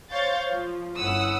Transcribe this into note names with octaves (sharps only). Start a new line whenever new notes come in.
C5 C#5 F5 G6 A6
F3
G1 C#4 E4 F#5 D#6 E6